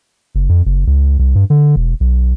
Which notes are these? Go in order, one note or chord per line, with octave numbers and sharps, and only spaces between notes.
F#1
F2
F#1
C#2
C2
G2
D3
E1
B1